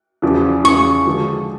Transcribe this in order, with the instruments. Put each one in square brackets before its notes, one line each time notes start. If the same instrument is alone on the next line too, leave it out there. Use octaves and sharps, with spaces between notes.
[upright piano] E2 C#3 F3
[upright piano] E2 C#3 F3 [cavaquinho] C#6
[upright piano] D3 F3 G#3